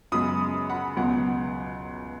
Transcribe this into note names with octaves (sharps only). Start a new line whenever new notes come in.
F#2 C#3 G#3 B3 B5 D#6
F#5 B5
C#2 B2 F#3 B3 F#5